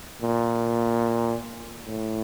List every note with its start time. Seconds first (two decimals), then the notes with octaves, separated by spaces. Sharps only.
0.21 A#2
1.86 A2